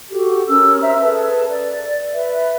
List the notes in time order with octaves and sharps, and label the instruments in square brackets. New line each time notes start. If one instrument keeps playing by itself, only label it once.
[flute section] F#4 G4 A4
C#4 A#4 E6
C5 E5 A#5
G#4 A4 B4 A5
D5
B4 E5